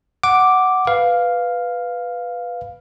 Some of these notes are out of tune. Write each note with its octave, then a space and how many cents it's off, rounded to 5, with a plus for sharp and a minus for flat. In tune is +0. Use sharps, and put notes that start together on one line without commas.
F#5 +5 D6 +0
B4 +0 F5 +0